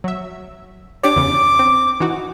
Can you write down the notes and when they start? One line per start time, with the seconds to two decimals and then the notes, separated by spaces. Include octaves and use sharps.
0.04 F#3 E5
1.03 D4 G4 C#5 D6
1.16 E2 C#3
1.59 C4
2.00 E3 D#4 F#4